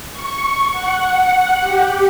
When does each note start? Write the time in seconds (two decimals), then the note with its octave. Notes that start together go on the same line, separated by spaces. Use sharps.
0.11 C#6
0.72 F#5
1.61 G4